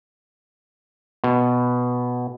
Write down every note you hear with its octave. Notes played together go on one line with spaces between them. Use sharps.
B2